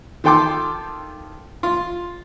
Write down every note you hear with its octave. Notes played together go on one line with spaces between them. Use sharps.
D#3 F4 A4 G5 C6 D6
F4